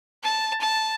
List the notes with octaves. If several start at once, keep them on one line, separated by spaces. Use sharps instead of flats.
A5
A5